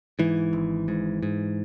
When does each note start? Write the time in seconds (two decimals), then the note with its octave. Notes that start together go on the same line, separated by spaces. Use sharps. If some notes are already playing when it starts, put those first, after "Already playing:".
0.19 G#2 E3
0.53 G#1
0.88 G#2
1.23 G#2